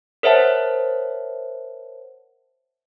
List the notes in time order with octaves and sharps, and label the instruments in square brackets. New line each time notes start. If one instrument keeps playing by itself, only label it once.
[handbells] A#4 C5 C#5 E5 F#5 A5